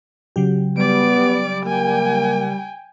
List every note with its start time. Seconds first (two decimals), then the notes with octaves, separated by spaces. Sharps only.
0.36 C#3 F#3 G4
0.77 G3 B3 D5 D7
1.65 A#3 G5 G#5